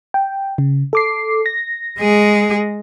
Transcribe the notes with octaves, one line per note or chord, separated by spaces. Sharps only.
G5
C#3
A4 D6 C7
A#6
G#3 G#4